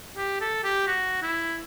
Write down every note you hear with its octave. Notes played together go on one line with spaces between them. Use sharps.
G4
A4
G4
F#4
E4